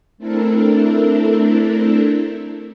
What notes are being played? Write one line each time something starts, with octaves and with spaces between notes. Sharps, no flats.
A3 C4 D4 E4 A4 A#4